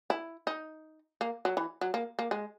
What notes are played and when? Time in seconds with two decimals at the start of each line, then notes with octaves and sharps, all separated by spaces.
0.10 E4
0.47 D#4
1.21 A#3
1.45 F#3
1.57 E3
1.81 F#3
1.94 A#3
2.19 A#3
2.31 G#3